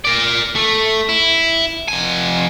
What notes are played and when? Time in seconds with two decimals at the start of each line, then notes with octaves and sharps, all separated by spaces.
0.05 A#4 D5
0.56 A3
1.09 E4
1.88 F2 G#5